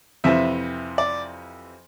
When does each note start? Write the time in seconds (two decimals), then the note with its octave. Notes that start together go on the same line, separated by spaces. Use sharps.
0.24 F2 C3 E3 E5
0.98 D5